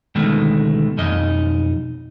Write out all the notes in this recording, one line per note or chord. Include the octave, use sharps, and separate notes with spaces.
D2 B2 D#3 G#3 A3
B1 F2 D#4 D#5